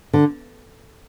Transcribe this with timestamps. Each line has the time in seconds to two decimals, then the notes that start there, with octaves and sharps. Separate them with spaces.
0.13 D3